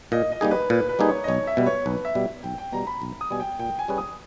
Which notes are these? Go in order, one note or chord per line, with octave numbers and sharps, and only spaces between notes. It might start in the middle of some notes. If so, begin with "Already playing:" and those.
A#2 D#5
D#5
G3 A#3 D#4 G#4
B4
A#2 B4
B4
G3 A#3 D#4 G#4
C#5
D#5
B1 C#5
E5
B2 G3 B4
C#5
B1 B4
E5
B2 G3
B1 G5
G5
B2 G3 A#5
B5
B1
D#6
B2 G3 G#5
G5
A#2 G5
G#5
G3 C#4 G#4 B4
D#6